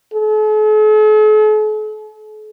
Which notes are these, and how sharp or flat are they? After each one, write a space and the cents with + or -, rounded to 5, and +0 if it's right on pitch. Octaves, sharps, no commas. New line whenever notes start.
A4 -45